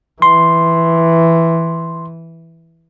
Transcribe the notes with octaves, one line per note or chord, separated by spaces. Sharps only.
E3 C6